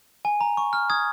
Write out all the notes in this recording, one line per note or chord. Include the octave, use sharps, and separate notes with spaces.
G#5
A#5
C#6
F6
D#6 G#6